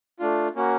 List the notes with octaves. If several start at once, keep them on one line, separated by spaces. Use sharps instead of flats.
A3 D4 F4
A#3 C#4 F#4